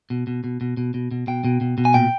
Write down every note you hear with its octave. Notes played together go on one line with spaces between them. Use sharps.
B2
B2
B2
B2
B2
B2
B2
B2 G5
B2
B2
B2
G#5
A#2 G5